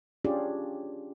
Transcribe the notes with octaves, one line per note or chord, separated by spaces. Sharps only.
C#4 D4 F4 G4 G#4 D5